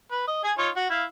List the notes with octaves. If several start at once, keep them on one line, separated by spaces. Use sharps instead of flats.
B4
D#5
G#4 G#5
D#4 F4 C#5
F#4
E4 F5